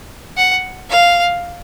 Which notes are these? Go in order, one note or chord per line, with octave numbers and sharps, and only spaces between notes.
F#5
F5